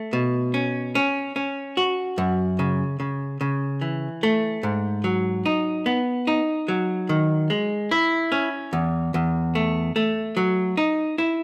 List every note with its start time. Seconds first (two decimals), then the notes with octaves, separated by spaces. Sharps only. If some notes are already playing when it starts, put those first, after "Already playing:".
Already playing: A3
0.13 B2
0.54 C#4
0.95 C#4
1.36 C#4
1.77 F#4
2.18 F#2
2.59 C#3
3.00 C#3
3.41 C#3
3.81 E3
4.23 A3
4.63 G#2
5.04 F#3
5.46 D#4
5.86 B3
6.27 D#4
6.68 F#3
7.09 D#3
7.50 G#3
7.91 E4
8.32 C#4
8.73 E2
9.14 E2
9.55 A3
9.96 A3
10.37 F#3
10.77 D#4
11.18 E4